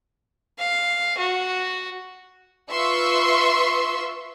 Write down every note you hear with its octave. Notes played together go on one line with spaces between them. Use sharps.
F5
F#4
F4 B4 E5 C6 C#6 E6